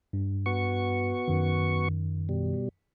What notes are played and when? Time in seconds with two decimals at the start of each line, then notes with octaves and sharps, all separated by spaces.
0.13 G2
0.46 B3 F#4 C#6
1.28 F#2 D#3
2.29 B2 G3